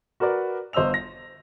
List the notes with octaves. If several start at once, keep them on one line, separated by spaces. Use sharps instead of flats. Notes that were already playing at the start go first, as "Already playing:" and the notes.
F#4 A#4 B4 D5
G1 C5 D#5 E6 F7
A#6